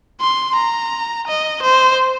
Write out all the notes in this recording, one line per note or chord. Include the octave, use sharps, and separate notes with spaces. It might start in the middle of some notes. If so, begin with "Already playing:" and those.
C6
A#5
D#5
C5